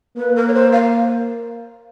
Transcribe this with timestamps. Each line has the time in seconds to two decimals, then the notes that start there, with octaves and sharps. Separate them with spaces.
0.18 A#3 B4
0.36 A#4
0.48 C#5
0.54 C5
0.72 F5